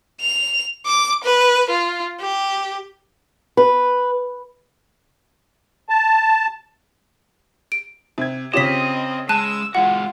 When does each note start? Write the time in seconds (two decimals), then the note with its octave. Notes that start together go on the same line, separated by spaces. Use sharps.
0.21 F7
0.86 D6
1.24 B4
1.70 F4
2.21 G4
3.57 B4
5.89 A5
7.72 D7
8.18 C3 G#6
8.54 C#3 C4 C#4 F4 G4 D#5 B6
9.29 G#3 A5 E6 F#6 D#7
9.75 G#3 F4 F#4 F#5